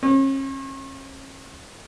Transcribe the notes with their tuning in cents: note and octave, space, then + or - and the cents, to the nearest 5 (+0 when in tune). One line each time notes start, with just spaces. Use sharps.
C#4 -40